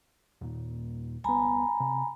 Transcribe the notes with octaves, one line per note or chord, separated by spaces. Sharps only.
D#2 A#2
C2 B3 G#5 A#5 B5
C3